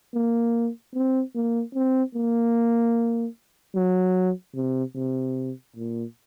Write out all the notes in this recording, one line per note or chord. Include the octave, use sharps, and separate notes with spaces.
A#3
C4
A#3
C4
A#3
F#3
C3
C3
A#2